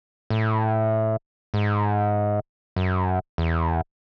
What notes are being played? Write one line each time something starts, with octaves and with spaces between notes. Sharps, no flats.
A2
G#2
F#2
E2